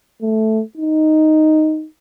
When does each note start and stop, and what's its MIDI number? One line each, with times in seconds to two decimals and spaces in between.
0.22 0.62 57
0.77 1.86 63